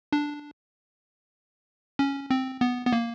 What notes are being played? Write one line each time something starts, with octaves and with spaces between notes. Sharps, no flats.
D4
C#4
C4
B3
B3
A#3